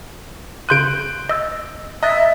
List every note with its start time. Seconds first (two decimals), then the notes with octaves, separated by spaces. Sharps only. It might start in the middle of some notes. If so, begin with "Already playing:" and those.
0.69 C#3 C6 F#6 G6 D7 D#7
1.29 D#5 E6 A6
2.03 D#5 E5 A#5 F#6 A6